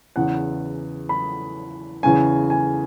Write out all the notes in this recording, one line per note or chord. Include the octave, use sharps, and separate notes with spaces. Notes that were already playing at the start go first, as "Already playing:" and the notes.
E2 C#3 E3 F#5
B5
E2 C#3 E3 G#5
G#5